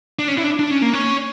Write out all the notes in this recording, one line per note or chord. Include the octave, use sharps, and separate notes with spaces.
D4
C#4
E4
D4
D4
C#4
A#3
C#4